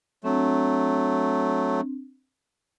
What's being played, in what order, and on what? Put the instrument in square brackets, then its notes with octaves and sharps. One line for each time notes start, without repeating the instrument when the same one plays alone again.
[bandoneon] F#3 A3 [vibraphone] C4 D4